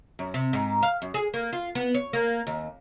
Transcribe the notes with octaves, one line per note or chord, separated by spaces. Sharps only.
F#2
C3
G#2
F5
F#2
G#4
A#3
F4
B3
C#5
A#3
D#2